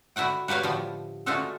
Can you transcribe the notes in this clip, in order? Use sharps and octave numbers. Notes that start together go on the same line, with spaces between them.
D3 E4 F#4 F#5 G5
F#4 G4 B4 C#5 F5
A2 D3 F3
D3 G#3 A3 F4 F#4 A4